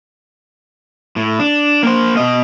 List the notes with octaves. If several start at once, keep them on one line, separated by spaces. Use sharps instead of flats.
A2
D4
A#3 C5
B2 D#5